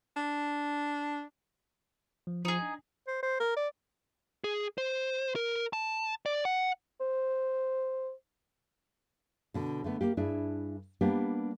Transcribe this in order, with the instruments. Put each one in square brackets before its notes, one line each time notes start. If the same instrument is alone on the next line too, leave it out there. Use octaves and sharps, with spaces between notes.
[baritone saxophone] D4
[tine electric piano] F3
[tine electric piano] F3 [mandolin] D#4 G#4
[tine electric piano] D4
[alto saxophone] C5
C5
A#4
D5
[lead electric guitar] G#4
C5
A#4
A5
D5
F#5
[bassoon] C5
[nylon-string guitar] B2 D3
D3 A3 B3
A#3 G4
G2 D4 E4 G#4
G3 A#3 B3 D4 G4